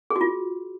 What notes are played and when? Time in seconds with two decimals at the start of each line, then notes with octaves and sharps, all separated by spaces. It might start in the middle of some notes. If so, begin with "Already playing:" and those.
0.10 G#4
0.16 F#4
0.21 F4